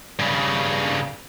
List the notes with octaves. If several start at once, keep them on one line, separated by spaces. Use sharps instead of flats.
G2 C#3